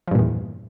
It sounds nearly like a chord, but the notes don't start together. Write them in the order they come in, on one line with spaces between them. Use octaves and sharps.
F3 G2 A#2 E2